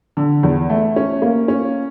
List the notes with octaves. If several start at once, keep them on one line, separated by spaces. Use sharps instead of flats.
D3
E2
A3
C#4
A#3
C#4